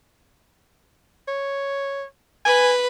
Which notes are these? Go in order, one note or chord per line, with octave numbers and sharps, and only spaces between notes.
C#5
B4 G#5